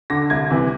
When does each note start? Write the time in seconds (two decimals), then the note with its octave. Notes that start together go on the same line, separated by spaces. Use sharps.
0.10 D3 A#6
0.30 C2 G#6
0.50 C3 E3